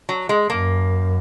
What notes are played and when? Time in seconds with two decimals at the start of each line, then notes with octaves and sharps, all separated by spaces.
0.09 F#3
0.29 G#3
0.50 F#2 A#3